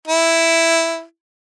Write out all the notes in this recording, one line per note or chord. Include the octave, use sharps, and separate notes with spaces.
E4